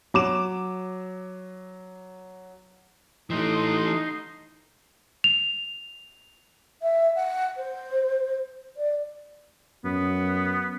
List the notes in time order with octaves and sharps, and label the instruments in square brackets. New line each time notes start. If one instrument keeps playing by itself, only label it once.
[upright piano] F#3 D6 E7
[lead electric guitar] E3 A3 [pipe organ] D#4 C6
[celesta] F7
[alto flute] E5
F#5
C5
D5
[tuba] F#2 [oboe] B3